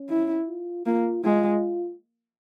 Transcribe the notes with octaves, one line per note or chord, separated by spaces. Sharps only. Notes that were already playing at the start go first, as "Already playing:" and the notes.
Already playing: C#4
E4
F4
A#3 F4
G#3 F4